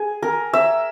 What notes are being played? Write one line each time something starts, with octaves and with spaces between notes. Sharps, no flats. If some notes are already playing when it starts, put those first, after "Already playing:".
Already playing: G#4
A#4
E5